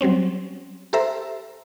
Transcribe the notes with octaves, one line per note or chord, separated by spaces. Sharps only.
F#3 G3 C4 C#4
G4 A4 C5 E5 A#5